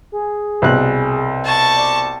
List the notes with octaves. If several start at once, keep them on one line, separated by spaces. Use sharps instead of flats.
G#4
C2 B2 F#6
A5 C#6 A6
D5